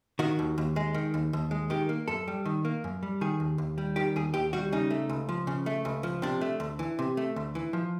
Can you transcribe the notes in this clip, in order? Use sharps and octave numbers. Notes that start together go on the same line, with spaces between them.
D#3 F#4
D#2
D#2
G#3
D#3
D#2
D#2
G#3
D#3 G4
A#3
F#2 A4
G3
D#3
A#3
F#2
G3
D#3 G#4
D#2
D#2
G3
D#3 G4
D#2 G#4
D#2 G4
G3 F#4
C#3 D#4
A3
C#2
F3
C#3
A3
C#2
F3
C3 D4
A3
D2
E3
C3
A3
D2
E3
F3